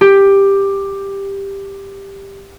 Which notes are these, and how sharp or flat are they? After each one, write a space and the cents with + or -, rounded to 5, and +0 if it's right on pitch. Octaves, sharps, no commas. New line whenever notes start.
G4 +10